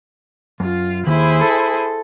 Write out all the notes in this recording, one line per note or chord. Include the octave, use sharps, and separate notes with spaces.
F#2 F4
D#2 E4 G#4 C5
A4